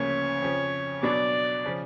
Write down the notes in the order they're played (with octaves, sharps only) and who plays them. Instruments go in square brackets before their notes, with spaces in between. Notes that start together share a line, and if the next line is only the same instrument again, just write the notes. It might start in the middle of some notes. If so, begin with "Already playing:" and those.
Already playing: [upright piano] D2 C#3 F3 A#3 C#4 [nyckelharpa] C#5
[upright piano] F2 C#3 F3
[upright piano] B2 F#3 B3 D4 [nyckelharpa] D5
[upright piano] C#3 F3